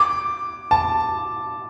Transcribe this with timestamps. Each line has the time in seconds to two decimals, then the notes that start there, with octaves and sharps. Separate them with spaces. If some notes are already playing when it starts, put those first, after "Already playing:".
Already playing: D6
0.71 A5